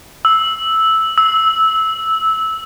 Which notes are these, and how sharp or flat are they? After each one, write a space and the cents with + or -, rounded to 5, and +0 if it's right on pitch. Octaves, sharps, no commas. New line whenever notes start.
E6 -10
E6 -15